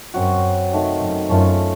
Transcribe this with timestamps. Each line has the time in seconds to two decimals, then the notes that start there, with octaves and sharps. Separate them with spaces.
0.14 F#2 F#3 C4 F#4
0.72 C3 D#3 A3 D#4
1.00 F#2
1.29 F#2 A3 C#4 F4 A4